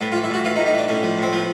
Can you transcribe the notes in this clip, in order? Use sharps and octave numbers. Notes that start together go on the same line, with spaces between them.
A2 B3
F4
E3
E4
A2 F#4
E3 F4
D#4
A2
D#4
E3 D4
A2 C#4
F3
A2 C4
F3 B3